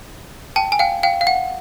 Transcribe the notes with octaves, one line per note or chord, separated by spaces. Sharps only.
G5 A5
G#5
F5 G5
F5 G5
F5
F#5